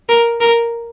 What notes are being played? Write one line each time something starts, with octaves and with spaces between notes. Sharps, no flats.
A#4
A#4